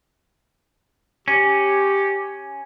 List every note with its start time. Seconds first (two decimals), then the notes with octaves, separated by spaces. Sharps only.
1.28 C#4 G4